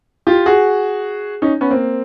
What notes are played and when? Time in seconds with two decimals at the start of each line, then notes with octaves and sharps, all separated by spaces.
0.27 F4 G4
0.46 F#4 G#4
1.42 C#4 D#4
1.61 B3 C#4
1.71 A#3 C4